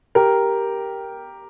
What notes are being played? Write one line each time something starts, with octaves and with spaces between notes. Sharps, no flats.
G4 A#4